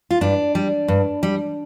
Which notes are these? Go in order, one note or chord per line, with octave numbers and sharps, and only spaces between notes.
F4
G2 D4
G3
G2
G3